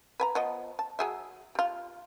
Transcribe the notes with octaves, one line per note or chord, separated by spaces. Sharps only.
B4 G#5 A#5
F3 B3 D#5
A5
F#3 G#4 E5
G3 F4